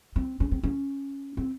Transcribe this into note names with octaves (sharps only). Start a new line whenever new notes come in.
C4
C#4
C4
C#4
C4